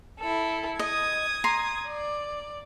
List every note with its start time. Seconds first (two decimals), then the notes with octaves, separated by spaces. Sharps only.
0.19 E4 A4
0.79 D#5 D#6 G#6
1.44 A#5 C6
1.87 D5